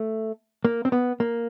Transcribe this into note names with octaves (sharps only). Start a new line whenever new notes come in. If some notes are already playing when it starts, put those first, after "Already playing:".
Already playing: A3
A#3
C4
B3
A#3